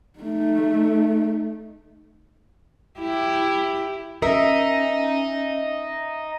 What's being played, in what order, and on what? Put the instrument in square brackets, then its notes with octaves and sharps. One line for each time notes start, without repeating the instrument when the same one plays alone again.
[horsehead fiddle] A3 D#4
[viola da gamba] E4 G4
[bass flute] C#4 [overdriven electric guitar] D#4 [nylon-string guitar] A#4 [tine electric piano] D#5 E5